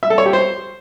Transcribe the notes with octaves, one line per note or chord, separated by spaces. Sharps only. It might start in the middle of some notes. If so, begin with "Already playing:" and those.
E5
A4
C#5
G4
C5